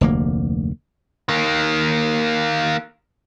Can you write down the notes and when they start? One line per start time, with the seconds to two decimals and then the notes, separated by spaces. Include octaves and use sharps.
0.01 F1 D2 A#3
1.29 D#3 A#3